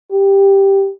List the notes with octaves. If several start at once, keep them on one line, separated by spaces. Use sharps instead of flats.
G4